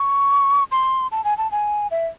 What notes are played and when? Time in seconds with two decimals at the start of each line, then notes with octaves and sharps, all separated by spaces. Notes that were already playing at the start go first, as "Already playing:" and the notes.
Already playing: C#6
0.71 C6
1.12 A5
1.24 G#5
1.38 A5
1.52 G#5
1.91 E5